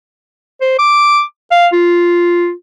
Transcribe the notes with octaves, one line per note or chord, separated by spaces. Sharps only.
C5
D6
F5
F4